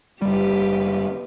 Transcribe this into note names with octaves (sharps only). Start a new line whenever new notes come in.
F#1 G3 G4 B4